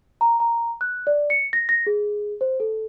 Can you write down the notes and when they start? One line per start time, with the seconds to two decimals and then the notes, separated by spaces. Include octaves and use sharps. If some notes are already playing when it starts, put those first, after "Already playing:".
0.21 A#5
0.40 A#5
0.81 F#6
1.07 D5
1.30 C#7
1.53 A#6
1.69 A#6
1.87 G#4
2.41 C5
2.60 A4